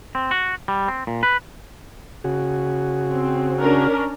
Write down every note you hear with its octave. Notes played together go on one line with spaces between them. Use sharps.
C4
F#4
G3
C4
A#2
B4
C#3 F#4 G#4
C4
C#4 D4 A#4